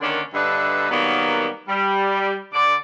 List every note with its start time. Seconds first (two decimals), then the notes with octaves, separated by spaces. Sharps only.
0.01 D3 D#3 A#3 C#4 D4
0.34 G2 D3 D4 B4 D#5 E5
0.90 D#3 F#3 G3 A#3 B3
1.68 G3
2.53 D3 D5